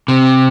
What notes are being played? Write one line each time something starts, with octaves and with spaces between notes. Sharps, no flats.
C3